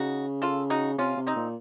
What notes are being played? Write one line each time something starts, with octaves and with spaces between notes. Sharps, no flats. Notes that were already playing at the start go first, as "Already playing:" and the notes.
Already playing: C#3 D#4 F#4
F4 A4
D#4 F#4
C3 C#4 F4
C3
C4 D#4
A#2